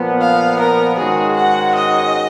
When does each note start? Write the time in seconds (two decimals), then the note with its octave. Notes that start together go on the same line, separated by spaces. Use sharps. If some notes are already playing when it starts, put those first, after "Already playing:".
Already playing: A#2 F3 B3
0.21 F5
0.60 A#4
0.98 G#2 D#3 G#3 C#4 F#4 G#4
1.36 F#5
1.75 D#5